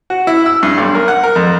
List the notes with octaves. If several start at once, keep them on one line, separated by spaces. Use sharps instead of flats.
F#4
E4
E6
G2
B1
A#4
F#5
A#4
F2